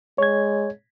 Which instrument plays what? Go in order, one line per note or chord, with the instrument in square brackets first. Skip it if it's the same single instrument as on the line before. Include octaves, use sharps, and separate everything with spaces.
[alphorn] G#3 [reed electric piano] C#5 G#6